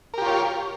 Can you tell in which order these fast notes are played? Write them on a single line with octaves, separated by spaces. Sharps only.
A#4 G4 F4 C#5